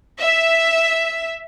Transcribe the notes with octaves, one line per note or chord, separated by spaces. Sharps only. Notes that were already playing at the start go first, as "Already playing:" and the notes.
E5